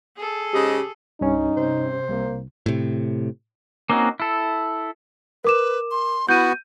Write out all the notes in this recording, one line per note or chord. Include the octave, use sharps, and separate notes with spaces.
G#4 A4
G#2 C#3 G4 D#5
C2 G2 C#4 D#4
C3 C5
C2 A#3
A2 C3
A#3 C4 C#4 D#4 F#4
E4 A4
A#4 B4 D6 E7
C6
B3 E4 F#4 G6 D#7